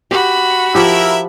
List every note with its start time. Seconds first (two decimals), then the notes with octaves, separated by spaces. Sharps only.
0.11 F#4 G4 B5
0.75 F3 E4 G4 A#4 E5